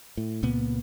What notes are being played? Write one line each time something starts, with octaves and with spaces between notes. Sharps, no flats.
A2
C#2 A#2 A#3 B3